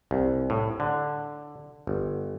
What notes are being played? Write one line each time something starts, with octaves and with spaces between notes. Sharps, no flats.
C2
A2
D3
G1